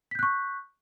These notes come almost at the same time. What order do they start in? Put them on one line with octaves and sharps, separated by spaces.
B6 G6 F#6 C#6